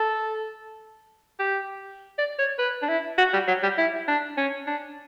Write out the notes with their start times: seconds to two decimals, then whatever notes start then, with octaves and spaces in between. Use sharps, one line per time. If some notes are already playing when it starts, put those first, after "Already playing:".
Already playing: A4
1.39 G4
2.18 D5
2.39 C#5
2.59 B4
2.82 D4
2.89 E4
3.18 F#4
3.33 G3
3.48 F#3
3.63 G3
3.78 E4
4.08 D4
4.37 C#4
4.67 D4